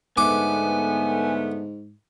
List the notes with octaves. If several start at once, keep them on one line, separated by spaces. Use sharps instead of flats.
G#2 D3 A3 B3 G#5 D6